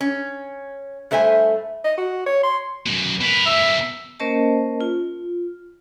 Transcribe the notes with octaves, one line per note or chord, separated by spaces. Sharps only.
C#4
G2 A3 C5 E5 G#5
D#5
F#4
C#5
C6
F#2 B2
B2 A#4 B4
E5
A#3 C#4 A#4 C5 D#5 A5
F4